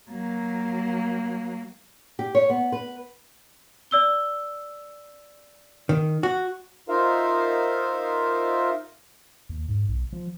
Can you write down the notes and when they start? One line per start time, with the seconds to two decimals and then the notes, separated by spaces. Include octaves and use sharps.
0.11 F#3 A#3
2.19 G4
2.35 C#5
2.50 B3
2.72 B4
3.91 D5 E6 G7
5.89 D#3
6.23 F#4
6.89 D#4 F4 A#4 C5 E5 F5
9.49 D#2
9.69 G#2
9.89 B1
10.13 F3